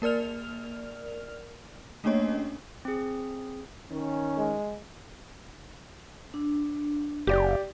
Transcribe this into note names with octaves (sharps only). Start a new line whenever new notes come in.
A#3 A#4 D5 F6 F7
A3 A#3 C#4 D4 C#5 D#5
C4 G#4
D#3 C#4
G#3
D4
F#1 G4 D5